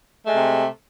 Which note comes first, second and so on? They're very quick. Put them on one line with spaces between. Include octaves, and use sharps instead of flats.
A3 G#3 C3